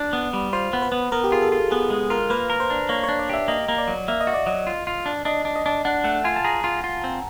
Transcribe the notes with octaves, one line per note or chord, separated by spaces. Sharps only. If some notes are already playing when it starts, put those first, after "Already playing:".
Already playing: D4
B3
G3
F4 C5
B3
B4
B3
B3 A#4
G4
F4 G#4
A4
F4
B3 G#4
G#3
F4 A#4
A#3 B4
A#4
C5
D4
A#3 C#5
D4 C#5
D5
G4 E5
A#3 D#5
A#3
D5
F#3
A#3 E5
D#5
F#4
D5
F#3 D#5
F4
F4
D4
D4 D#5
D4
D#5
D4
D4 F#5
A3 F#5
F4 G#5
A5
G#4 A#5
F4
F4
C4